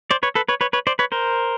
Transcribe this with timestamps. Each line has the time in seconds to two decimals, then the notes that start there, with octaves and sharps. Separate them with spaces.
0.11 C5 D5
0.23 B4 C#5
0.35 A4 B4
0.49 B4 C#5
0.61 B4 C#5
0.73 B4 C#5
0.87 C5 D5
0.99 B4 C#5
1.12 A#4 C5